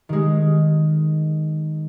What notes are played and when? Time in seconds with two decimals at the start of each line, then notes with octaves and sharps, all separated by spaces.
0.09 D#3 G#3